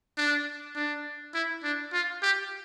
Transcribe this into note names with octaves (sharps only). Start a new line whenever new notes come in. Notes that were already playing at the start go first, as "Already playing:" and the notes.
D4
D4
E4
D4
F4
G4